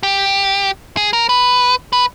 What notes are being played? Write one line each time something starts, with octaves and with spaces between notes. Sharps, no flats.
G4
G#4
A#4
B4
B4